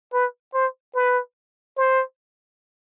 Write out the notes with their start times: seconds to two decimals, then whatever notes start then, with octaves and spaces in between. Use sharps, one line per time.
0.13 B4
0.54 C5
0.95 B4
1.77 C5